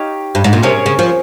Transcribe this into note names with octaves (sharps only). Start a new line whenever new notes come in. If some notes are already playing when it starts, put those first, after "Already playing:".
Already playing: D#4 G4 C#5 F5
G2
G#2
A#2
C3 A#3 C#4 G#4 C#5
C#3
F3